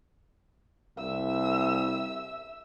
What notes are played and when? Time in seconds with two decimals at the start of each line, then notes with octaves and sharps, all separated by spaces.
0.97 C2 E5 E6